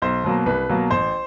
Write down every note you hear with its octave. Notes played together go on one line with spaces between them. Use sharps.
B1 C5
B2 F#3 A#3
C2 B4
B2 F#3 A#3
A1 C5